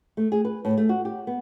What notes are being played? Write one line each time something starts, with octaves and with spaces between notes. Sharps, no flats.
A3
G#4
B4
A2
A3
F#4
G4
B3